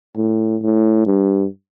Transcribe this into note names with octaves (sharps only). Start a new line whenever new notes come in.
A2
A2
G2